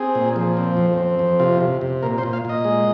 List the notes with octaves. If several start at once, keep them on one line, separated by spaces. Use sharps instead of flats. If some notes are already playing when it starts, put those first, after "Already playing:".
Already playing: C4 G#4
A#2
F3
C4
F2
C4
F2
C3 F4
C3
C3
A#2 A#4
C5
A#2
F5
A#2 D#5
G#3